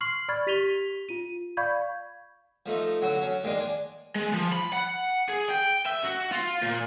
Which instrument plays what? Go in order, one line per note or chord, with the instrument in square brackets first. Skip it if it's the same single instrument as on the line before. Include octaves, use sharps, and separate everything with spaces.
[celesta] C6 C#6 F6 C7 F#7
D5 B5 C#6 F6 G#6 A6
G4 B6 D#7 F7 G7
F4 D#7
D5 F5 B5 C#6 G6 G#6
[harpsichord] F3 A3 D#4
D3 F#3 F#4
F#3 C#4
D#3 G#3 A#3 D4
D5 G#5
[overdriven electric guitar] G#3
F3
B5
F#5
G#4
G5
E5
F#4
F4
A#2